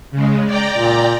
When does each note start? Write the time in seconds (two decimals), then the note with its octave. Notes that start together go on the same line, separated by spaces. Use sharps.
0.11 C#3 G#3
0.45 D5 G5 A#5
0.77 A#2